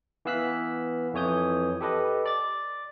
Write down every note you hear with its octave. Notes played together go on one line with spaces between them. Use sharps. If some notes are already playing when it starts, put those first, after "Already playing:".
E3 B3 F5 E6 F#6 B6
F2 E3 C#5 D#6 G6
G4 A4 B4 D#5
D5 A6